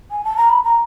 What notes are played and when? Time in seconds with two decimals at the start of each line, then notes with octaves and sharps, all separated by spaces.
0.11 G#5
0.25 A5
0.37 A#5
0.50 B5
0.65 A#5